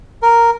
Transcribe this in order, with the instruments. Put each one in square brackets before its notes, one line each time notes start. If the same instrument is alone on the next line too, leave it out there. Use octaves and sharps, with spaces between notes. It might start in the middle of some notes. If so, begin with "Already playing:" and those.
[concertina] A#4